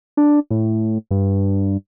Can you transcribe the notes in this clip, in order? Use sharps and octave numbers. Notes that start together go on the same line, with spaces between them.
D4
A2
G2